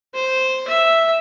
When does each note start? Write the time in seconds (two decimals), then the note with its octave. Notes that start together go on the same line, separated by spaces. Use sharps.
0.14 C5
0.67 E5